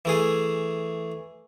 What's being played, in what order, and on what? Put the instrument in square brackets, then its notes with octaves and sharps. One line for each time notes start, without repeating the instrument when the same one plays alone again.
[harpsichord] E3 A3 G#4